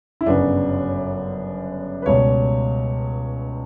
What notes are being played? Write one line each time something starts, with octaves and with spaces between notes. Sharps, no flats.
E4
G1 F#2 C#3 F#3 B3 D4
B4
C#2 B2 G3 C#5